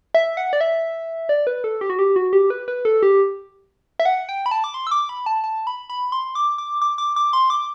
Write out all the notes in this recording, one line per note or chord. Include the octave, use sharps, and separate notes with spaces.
E5
F#5
D5
E5
D5
B4
A4
G4
F#4
G4
F#4
G4
B4
B4
A4
G4
E5
F#5
G5
B5
A5
D6
C6
E6
D6
B5
A5
A5
B5
B5
C6
D6
D6
D6
D6
D6
C6
D6